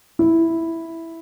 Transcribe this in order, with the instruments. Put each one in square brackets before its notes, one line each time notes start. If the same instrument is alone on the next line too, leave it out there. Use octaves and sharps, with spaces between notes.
[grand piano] E4